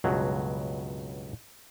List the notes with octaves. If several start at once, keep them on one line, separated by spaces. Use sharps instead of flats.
C#2 G2 B2 F#3